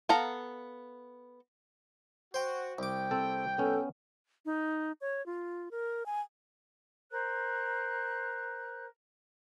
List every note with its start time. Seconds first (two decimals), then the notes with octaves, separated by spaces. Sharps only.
0.09 B3 A4 F5 A#5
2.34 F#4 C5 G5
2.78 C2 G5 D6
3.11 C4 A4
3.58 B3 C#4 A4
4.46 D#4
5.01 C#5
5.26 F4
5.71 A#4
6.06 G#5
7.10 A#4 C5 F#6